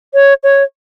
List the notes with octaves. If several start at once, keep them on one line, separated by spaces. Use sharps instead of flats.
C#5
C#5